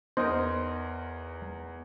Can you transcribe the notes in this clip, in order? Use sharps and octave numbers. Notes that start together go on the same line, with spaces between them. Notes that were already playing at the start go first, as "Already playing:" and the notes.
E2 D#4 A#4 C5 D#5